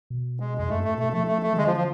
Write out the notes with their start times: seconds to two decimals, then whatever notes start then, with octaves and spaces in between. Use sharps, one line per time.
0.10 B2
0.40 G#3
0.58 F2 G#3
0.69 F#2 A3
0.84 G#2 A3
0.98 B2 A3
1.13 F3 A3
1.27 A3
1.43 A3
1.53 F3
1.57 D3 G#3
1.67 F3
1.77 F3